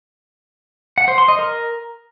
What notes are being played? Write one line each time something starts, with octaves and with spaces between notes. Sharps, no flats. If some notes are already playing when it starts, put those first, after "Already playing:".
F#5
C5
C6
D#5
A#4